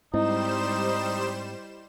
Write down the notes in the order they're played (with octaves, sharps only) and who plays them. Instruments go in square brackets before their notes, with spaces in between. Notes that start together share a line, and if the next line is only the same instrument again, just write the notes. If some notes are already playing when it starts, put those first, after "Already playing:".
[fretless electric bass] G#2 C4 [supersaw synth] G3 C5 E7 [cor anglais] D#4 [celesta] E4 D#5